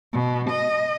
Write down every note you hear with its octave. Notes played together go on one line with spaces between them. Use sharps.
B2
D#5